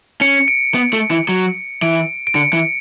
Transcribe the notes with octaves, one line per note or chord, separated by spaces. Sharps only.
C#4 C#7
D7
B3
A3
E3
F#3
E3 D7
D7
D3 C#7
E3